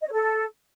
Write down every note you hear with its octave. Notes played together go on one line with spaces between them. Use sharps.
D#5
C#5
A4